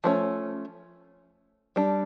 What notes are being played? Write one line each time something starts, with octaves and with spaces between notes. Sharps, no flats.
F3 A3 C#4
G3 D4